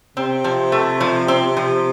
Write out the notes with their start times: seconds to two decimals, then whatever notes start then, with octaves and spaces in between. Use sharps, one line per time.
0.17 C3 C4
0.44 F3
0.72 A3
1.01 F3
1.28 C4
1.57 F3